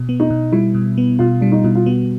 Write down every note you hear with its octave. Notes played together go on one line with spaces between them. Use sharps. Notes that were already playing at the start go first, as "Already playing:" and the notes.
Already playing: B2
B3
D#4
B2
G3 E4
B2
B3
B2 F4
G3 D4
D#4
B2 E4
F4
B3 F#4